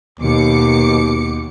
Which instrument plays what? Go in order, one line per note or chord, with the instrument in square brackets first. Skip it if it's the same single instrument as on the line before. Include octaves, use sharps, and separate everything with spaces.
[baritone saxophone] D#2 [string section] B2 D6 C#7